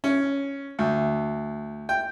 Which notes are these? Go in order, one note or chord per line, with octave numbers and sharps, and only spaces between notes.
C#4
D2
G5